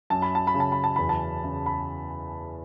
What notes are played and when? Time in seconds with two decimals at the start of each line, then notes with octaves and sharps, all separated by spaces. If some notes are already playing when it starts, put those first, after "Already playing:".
0.10 F#2 A5
0.22 B5
0.35 A5
0.47 B5
0.54 C#3
0.60 A5
0.72 B5
0.84 A5
0.96 E2 B5
1.09 A5
1.44 C#3
1.66 B5